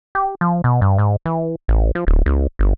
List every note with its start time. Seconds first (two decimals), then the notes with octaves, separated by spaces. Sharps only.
0.15 G4
0.41 F3
0.64 B2
0.81 G2
0.98 G#2
1.26 E3
1.68 A1
1.95 F3
2.07 D1
2.26 C#2
2.59 G1